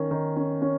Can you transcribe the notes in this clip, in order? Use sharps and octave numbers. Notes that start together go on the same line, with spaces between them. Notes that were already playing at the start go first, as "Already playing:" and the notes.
Already playing: D#3 C#4
D#3
C#4
C#4